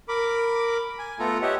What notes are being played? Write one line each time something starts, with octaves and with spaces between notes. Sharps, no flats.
A#4 B5 D6
G#5
A3 B3 F4 A4 A#5
G4 C#5 D#5 E5 F#5